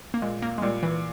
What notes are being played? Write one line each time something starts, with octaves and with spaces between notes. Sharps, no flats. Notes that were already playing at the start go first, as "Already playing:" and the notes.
A#3
A#2 G#3
A#3
G#3
A#2 G3
E3